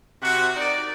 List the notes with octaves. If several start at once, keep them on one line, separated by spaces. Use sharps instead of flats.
C3 F#4
D#4 A#4 D5